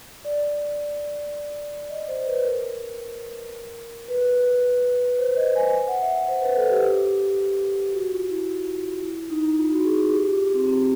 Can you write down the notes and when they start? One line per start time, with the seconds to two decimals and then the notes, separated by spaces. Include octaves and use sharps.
0.25 D5
1.89 D#5
2.08 C5
2.26 B4
2.45 A#4
4.08 B4
5.19 C5
5.36 D#5
5.56 G#5
5.88 F#5
6.01 E5
6.28 C5
6.41 B4
6.56 A4
6.70 G4
7.93 F#4
8.12 F4
8.30 E4
9.03 E4
9.30 D#4
9.58 F4
9.71 F#4
9.85 G#4
9.98 G#4
10.12 G4
10.27 F4
10.54 C4
10.67 C4